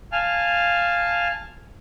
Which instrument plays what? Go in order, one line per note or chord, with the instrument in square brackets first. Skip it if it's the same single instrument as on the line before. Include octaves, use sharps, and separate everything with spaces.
[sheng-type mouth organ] F5 G#5 A5 F6